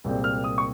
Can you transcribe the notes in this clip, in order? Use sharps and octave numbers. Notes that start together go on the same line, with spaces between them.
C2 A#2 G#3 C4
F6
D#6
C#6